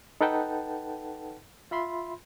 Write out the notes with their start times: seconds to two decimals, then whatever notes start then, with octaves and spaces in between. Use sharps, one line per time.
0.21 D#4 A4 B4 F#5 G5 A5
1.71 F4 E5 B5 C6